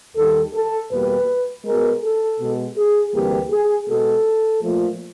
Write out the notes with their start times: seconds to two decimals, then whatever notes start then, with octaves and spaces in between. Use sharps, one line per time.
0.16 D#2 D#3 G3 A4
0.54 A4
0.91 E2 B2 G3 A#3 B4
1.65 B2 G#3 A#4
2.03 A4
2.39 B2 G#3
2.77 G#4
3.13 D2 C3 E3 G3 A#3 G4
3.51 G#4
3.88 B2 G#3 A4
4.62 A#2 F3 A3